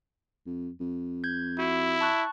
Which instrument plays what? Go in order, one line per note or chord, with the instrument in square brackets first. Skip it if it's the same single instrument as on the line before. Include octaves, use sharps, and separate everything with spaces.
[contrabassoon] F2
F2
[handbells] G6 G#6
[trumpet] E4 [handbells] F#4
[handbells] A5 C#6 F#6